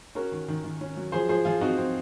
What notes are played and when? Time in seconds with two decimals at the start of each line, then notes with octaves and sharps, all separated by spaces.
0.15 C#4 F#4 A#4
0.32 D#3
0.48 D#3
0.64 D#3
0.81 C#4
0.97 F#3
1.12 F3 G#4 C5
1.29 F3 G#4 C5
1.45 F3 F4 G#4
1.61 C4 D#4 F#4
1.78 C4